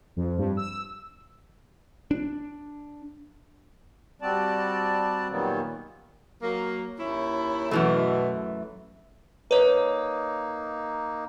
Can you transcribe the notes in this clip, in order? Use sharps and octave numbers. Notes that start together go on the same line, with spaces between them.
F2
G2
E6
D4
G3 C4 F#4 D5 A5
A#2 D#3 F#3 G3 A#3 B3
F#3 A#3
D#2 C#4 E4
F#2 B2 E3 A3
A#3 D#4 B4 C#5